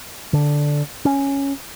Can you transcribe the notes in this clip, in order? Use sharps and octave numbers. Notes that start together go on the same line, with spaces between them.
D3
C#4